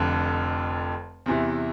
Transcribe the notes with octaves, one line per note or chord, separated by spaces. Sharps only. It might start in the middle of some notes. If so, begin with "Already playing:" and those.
Already playing: F1 F2 D3
E2 C3 E3